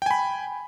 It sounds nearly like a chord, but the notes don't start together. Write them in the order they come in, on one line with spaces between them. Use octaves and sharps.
G5 G#5 B5